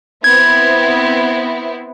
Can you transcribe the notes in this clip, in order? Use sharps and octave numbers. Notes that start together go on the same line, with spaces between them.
B3 C4 E4 G#6